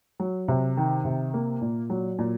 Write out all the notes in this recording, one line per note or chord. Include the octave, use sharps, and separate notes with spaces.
F#3
C3
D#3
C3
A#3
A#2
F#3
A#2